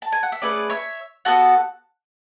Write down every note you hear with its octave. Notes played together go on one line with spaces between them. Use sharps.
A5
G#5
F#5
E5
A3 C#4 G#4 B4 D5
C#5 E5
B3 F#4 A4 F#5 A5